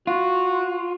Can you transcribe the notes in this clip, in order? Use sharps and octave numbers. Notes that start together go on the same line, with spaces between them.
F4 F#4